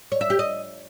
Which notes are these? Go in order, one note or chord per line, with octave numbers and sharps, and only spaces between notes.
C#5
E5
G4
D#5